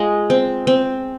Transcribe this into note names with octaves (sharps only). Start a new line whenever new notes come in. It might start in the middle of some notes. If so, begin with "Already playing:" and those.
Already playing: G#3 F4
C4
C4